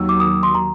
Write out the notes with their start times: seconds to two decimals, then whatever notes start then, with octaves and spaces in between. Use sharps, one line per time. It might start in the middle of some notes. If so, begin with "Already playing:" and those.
Already playing: D#2 D#3 F#3 E6
0.09 D6
0.20 D#6
0.43 C6
0.55 A#5